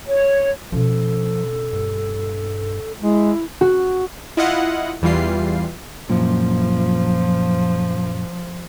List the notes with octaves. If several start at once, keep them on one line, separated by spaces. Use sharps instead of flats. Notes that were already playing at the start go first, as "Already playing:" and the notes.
C#5
B2 F3 C#4 A4
G2
G#3 E4
F#4
E4 F4 D#5 F5 F#5
E2 E3 G3 F4 C7
F#2 A#2 F3